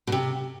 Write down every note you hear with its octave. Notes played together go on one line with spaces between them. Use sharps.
B2
C3